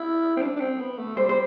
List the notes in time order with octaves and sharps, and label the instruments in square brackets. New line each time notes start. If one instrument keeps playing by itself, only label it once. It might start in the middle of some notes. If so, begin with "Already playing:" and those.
Already playing: [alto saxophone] E4
C4
D4
D4
C4
B3
A3
[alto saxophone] G3 [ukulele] C5
[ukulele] C5